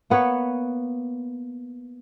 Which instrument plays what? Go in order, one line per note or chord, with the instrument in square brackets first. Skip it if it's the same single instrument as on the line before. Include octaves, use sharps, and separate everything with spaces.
[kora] A#3 B3 B4 C#5